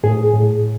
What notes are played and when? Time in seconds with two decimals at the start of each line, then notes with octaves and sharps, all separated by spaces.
0.04 A2 G#4
0.34 A2